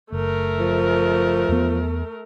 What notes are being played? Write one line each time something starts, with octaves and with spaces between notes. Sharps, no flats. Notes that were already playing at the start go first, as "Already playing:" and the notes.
F#1 A3 A#4
F3
E2 B3